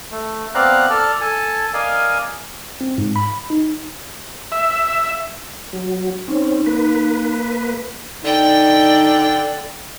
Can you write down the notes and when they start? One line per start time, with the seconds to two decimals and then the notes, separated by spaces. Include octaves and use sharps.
0.11 A3
0.55 B3 C4 D5 F5 A#5 F#6
0.90 A4 D5 A5 F6
1.21 A4 G#5 A5
1.74 A#4 D5 D#5 F5 G#5
2.81 C4
2.98 G#2
3.16 B5
3.50 D#4
4.52 E5
5.73 F#3
6.28 C4 C#4 D#4
6.66 A#3 B4
8.25 D3 D#4 D5 G5